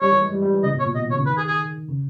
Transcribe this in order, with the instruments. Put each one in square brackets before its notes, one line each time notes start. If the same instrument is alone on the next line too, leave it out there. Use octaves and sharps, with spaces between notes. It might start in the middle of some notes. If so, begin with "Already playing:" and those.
[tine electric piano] G3 [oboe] C#5
[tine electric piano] E3
G#3
G3
G3
E3
[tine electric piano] C#3 [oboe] D#5
[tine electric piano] B2
[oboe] C#5
[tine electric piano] A#2
[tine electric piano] B2 [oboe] D#5
[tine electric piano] D#3
[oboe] C#5
[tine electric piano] C#3
[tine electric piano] D#3 [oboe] B4
[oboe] G#4
G#4
[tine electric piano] C#3